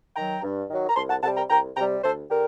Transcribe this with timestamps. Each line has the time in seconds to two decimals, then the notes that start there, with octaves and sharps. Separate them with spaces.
0.16 D#3 F#3 G5 A#5
0.42 G2
0.70 D#3 F#3
0.88 A#5
0.96 C2 A5 C6
1.10 F#5 A5
1.23 C3 F#5 A5
1.27 G3
1.36 G5 A#5
1.50 C2 G5 A#5
1.76 C3 G5 A#5
1.80 G3
2.03 D2 A4 C5
2.30 D3 G4 A#4